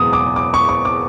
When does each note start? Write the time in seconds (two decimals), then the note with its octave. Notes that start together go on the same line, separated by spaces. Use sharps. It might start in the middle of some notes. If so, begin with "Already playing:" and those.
Already playing: F#1 E2 B2 G#3 D#6
0.13 D6
0.36 D6
0.54 C#6
0.69 C#6
0.85 D6